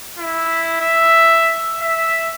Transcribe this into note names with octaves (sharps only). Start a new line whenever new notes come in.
E4
E5
E5